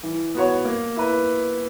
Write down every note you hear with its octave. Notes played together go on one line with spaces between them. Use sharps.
E3
B3 F#4 C#5
A#3
E4 B4